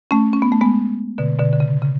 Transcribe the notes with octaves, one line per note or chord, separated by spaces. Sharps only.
A3 C#4
C#4
B3
A3
G#3 B3
B2 D3
B2 D3
D3
C#3
C#3